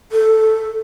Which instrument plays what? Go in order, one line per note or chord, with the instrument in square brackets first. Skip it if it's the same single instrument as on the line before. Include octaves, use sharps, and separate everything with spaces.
[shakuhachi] A4